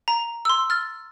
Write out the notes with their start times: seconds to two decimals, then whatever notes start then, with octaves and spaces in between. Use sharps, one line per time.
0.08 A#5
0.45 C6 E6
0.70 F6 A6